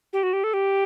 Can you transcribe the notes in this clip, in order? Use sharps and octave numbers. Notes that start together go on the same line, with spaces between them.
G4
F#4
G4
A4
G4